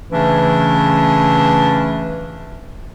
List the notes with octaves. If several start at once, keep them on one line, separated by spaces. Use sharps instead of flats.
C#3 E3 A3 C#4 D4